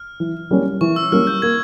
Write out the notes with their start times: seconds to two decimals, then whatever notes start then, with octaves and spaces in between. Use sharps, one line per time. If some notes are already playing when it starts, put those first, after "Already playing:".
Already playing: F6
0.20 E3
0.51 G3 A#3 C#4
0.81 E3 C#6
0.96 E6
1.12 G3 A#3 C#4 F6
1.27 G6
1.42 A#3 G#6